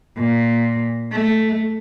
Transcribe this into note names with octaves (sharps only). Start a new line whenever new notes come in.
A#2
A3